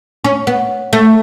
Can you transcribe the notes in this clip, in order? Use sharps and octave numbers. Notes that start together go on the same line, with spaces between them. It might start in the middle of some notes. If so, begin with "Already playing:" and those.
C#4
B3
A3